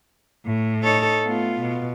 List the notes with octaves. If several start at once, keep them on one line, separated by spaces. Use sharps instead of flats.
A2
D#4 A4 C#5
A3 B3 F4
B2